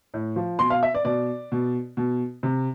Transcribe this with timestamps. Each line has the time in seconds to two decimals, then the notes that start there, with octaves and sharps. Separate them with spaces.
0.14 A2
0.36 F3
0.59 B2 C6
0.70 F5
0.83 E5
0.94 D5
1.05 B2 D5
1.52 B2
1.97 B2
2.43 C3